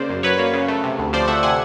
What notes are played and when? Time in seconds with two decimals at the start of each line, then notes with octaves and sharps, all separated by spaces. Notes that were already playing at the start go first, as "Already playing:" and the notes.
Already playing: C#3 A#3 C5 D5
0.09 F#2
0.23 F#3 B4 C#5
0.39 A#3
0.53 C#3
0.68 A3
0.84 C3
0.99 D2
1.13 F3 C5 D5
1.28 A3 E5 F#5
1.43 C3 F#5 G#5